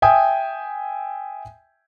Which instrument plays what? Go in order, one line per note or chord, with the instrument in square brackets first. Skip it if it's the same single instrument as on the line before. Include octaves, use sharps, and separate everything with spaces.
[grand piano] E5 G5 G#5 D#6